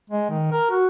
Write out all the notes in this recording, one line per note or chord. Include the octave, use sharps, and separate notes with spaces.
G#3
D#3
A#4
F#4